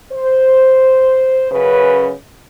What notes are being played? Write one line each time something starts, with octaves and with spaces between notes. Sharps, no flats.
C5
F#2 C#3 B4